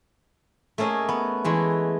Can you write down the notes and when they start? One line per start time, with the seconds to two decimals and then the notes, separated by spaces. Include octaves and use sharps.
0.78 A3 A#3 C#4 G#4 D#5
1.09 B3
1.44 E3 G#3 A3